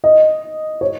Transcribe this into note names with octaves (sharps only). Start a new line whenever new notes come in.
D#5
C#5